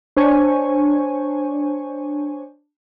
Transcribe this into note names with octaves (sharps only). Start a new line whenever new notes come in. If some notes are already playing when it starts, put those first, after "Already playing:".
D4 C5 C#5 G#5 C#6